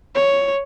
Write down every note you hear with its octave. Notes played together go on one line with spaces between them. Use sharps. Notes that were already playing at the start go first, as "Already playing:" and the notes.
C#5